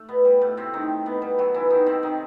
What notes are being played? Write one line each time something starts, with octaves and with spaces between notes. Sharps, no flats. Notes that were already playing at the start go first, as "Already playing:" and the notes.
Already playing: A3
B2 B3
G3
A2 A3
C3 C4
D#3 D#4
B2 B3
G3
F#3 F#4
E3 E4
D#3 D#4
C3 C4
D#3 D#4